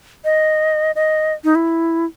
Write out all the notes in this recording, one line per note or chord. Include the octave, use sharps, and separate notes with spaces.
D#5
D#5
D#4
E4